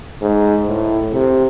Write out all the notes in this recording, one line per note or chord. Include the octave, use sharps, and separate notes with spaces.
G#2
A2
C3